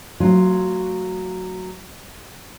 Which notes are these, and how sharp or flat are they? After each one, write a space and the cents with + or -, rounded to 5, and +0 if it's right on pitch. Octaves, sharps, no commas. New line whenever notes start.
F#3 +0 A3 +40 F4 +0